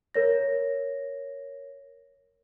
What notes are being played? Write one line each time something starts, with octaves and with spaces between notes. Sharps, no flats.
A#4 C#5 A#6